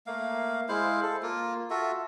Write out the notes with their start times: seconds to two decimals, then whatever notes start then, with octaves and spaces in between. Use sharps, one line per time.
0.07 A3 A#3 F5
0.69 G#3 E4 C5 F5
1.02 A4
1.23 A#3 F4
1.70 F4 F#4 A4 E5